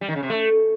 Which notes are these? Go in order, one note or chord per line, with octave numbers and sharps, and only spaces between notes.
G3
D#3
C#3
C3
A3